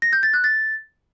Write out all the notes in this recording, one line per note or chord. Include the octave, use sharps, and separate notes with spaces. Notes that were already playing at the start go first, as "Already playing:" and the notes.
A#6
G6
A6
F#6
A6